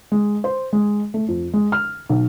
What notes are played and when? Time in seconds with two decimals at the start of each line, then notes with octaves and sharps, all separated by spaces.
0.12 G#3
0.44 C5
0.73 G#3
1.14 A3
1.28 F2
1.54 G#3
1.72 F6
2.09 B1